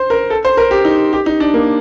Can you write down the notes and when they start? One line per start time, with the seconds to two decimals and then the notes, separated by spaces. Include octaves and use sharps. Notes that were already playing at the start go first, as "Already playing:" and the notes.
Already playing: C5
0.10 A#4
0.30 A4
0.45 C5
0.57 A#4
0.71 G4
0.85 D#4
1.13 G4
1.26 D#4
1.40 D4
1.54 A#3